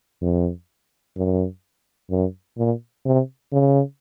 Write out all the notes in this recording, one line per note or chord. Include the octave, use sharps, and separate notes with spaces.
F2
F#2
F#2
A#2
C3
C#3